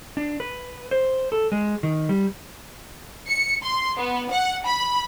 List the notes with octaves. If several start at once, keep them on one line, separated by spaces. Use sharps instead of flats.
D4
B4
C5
A4
G#3
D#3
G3
C#7
C6
B3
F#5
B5